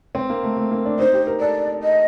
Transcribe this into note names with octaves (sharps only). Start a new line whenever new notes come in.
C4
A#3
A3
A3
A#3
D4
D#4 C5
G4
A#4
A4 D5
D#5